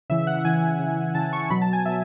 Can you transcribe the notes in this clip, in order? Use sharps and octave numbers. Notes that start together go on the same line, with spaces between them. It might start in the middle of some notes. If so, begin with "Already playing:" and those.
C#3 E3 E5
F#5
C#3 E3 G#5
C#3 E3
C#3 E3 A5
C#6
B2 F#3 B5
A5
G#5
B2 F#3 E5